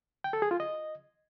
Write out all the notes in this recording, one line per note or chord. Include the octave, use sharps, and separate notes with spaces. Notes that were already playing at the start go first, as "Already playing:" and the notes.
G5
A4
G#4
F4
D#5